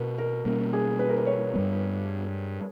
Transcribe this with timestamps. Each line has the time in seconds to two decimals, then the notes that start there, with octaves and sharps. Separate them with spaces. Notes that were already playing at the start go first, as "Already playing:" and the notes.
Already playing: B2 A#3 C#4 A#4 B4
0.18 A#4
0.45 B2 G3 A#3 C#4 A#4
0.73 G#4
0.99 B4
1.09 A#4
1.18 B4
1.26 C#5
1.54 G2 G3 B3